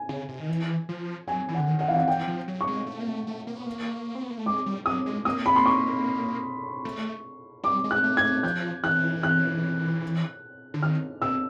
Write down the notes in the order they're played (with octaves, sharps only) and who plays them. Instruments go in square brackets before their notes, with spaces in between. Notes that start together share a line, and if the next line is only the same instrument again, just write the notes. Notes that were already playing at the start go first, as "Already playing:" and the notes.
Already playing: [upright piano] G#5
[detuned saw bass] C#3
C3
D#3
E3
F3
[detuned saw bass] F#3 [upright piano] G#5
[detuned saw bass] E3
[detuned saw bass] D3 [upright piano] F#5
[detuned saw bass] D#3
[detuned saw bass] D#3 [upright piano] F#5
[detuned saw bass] E3 [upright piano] F5
[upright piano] F#5
[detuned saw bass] E3 [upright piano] G5
[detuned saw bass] F3
F#3
[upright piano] C#6
[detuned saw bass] G#3
A3
A#3
A3
A3
A#3
B3
A#3
C4
B3
A#3
A3
[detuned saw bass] G#3 [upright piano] D6
[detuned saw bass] G3
[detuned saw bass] F#3 [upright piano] D#6
[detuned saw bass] G#3
[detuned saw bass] A#3 [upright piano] D#6
[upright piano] B5
C6
C#6
[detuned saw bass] A3
[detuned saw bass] G3 [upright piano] D6
[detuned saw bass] G#3
[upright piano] F#6
[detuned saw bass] A3
[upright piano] G#6
[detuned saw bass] A3
[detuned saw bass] F3 [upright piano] G6
[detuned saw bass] E3 [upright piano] F#6
[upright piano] F#6
[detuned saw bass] D3
[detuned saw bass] D#3 [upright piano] F6
[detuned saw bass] B2 [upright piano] E6